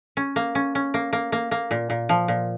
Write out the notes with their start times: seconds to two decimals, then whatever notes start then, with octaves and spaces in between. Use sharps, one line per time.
0.17 C#4
0.36 A#3
0.55 C#4
0.75 C#4
0.94 A#3
1.13 A#3
1.32 A#3
1.51 A#3
1.71 A#2
1.90 A#2
2.09 F3
2.28 A#2